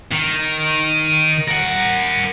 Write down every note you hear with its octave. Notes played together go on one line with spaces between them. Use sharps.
D#3
A#4 F#5